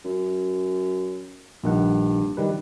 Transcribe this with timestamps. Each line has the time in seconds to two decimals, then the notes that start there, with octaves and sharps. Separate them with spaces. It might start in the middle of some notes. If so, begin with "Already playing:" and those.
0.05 F#2
1.64 A#1 G2 D#3 F#5
2.37 D#3 G3 B4